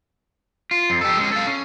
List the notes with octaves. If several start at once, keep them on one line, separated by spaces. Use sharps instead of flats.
F4
F2
G4 A4
G#3 C#4
A4 F5
C#4